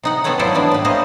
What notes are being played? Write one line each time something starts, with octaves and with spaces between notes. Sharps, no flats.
C3 D#4 F#5
B3 C4 A4 B4 C#5 F#5
F#3 A3 E4 F4 C5 D5
E3 B3 D4 E4
A2 B4
G3 G#3 A#3 C5 C#5 D#5